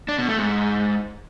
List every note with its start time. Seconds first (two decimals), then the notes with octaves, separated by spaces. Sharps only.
0.08 D4
0.18 B2
0.28 A3
0.38 G#2